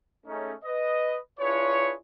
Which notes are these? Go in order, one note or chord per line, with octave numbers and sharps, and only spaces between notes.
G#3 A3 C#4 D#4
B4 D#5
D4 E4 F4 G#4 B4 C#5